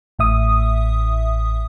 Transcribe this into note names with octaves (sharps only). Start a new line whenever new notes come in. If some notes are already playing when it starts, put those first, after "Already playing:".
A1 A2 E5 D#6